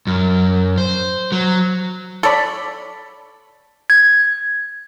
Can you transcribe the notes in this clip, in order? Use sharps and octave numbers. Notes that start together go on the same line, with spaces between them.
F#2
C5
F#3
A4 C#5 D5 B5
G#6